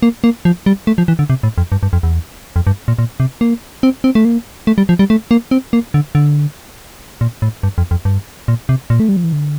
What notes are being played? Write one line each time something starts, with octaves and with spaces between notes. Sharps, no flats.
A#3
A#3
F3
G3
A3
F3
E3
D3
C3
A2
F2
G2
G2
F2
E2
F2
G2
A#2
A#2
C3
A#3
C4
C4
A3
A#3
A3
G3
F3
G3
A3
A#3
C4
A#3
D3
D3
A#2
A2
G2
F2
F2
G2
A#2
C3
A#2
A3
G3
F3
E3
D3